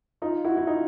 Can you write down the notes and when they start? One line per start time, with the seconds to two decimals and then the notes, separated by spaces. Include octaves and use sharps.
0.22 D#4 F4
0.45 E4 F#4
0.57 E4
0.67 D#4 F4